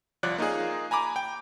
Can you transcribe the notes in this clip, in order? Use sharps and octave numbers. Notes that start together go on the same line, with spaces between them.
C2 F3 C#5 D5 F#6
A#3 D#4 F4 G#4
G#5 A#5 B5 D6
G5